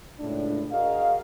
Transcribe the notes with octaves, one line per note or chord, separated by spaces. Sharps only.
C#2 A2 D4
F#4 G#4 A#4 D#5 F5